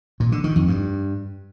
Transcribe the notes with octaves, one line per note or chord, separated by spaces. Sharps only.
A#2
D3
D#3
F2
G2